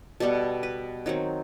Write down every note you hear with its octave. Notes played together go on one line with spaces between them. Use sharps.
B2 G3 B3 A4
B4
D#3 F#3 C4